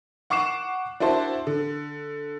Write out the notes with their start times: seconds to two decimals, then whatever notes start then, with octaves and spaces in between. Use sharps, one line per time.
0.30 F#5 C#6 D6 C7 E7
1.00 D4 E4 F#4 C5 A5
1.47 D3